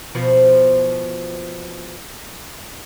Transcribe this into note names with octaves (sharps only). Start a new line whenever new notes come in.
B2 F3